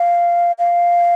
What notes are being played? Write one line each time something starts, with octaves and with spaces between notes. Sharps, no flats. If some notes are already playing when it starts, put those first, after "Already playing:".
Already playing: F5
F5